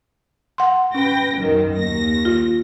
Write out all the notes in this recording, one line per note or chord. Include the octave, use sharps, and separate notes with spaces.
F#5 C6
C#4 B4 G5 A#6
B1 F#2 D#3
D#2 A#6
F4